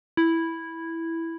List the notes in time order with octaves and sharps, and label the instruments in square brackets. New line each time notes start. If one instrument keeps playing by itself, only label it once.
[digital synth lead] E4